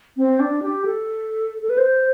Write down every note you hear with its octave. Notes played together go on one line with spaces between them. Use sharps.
C4
D4
G4
A4
A4
B4
C5